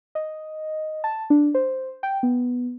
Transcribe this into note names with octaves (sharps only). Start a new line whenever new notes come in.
D#5
A5
D4
C5
G5
B3